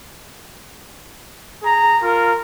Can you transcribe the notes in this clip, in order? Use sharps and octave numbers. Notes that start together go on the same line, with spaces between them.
G#4 A#5
F4 A#4